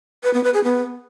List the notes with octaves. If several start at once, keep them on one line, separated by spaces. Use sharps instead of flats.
B4
B3
B4
G#4
B3